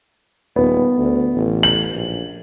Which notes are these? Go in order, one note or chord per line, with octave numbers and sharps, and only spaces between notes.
D#1 B3
D2
A1
F#7
A#1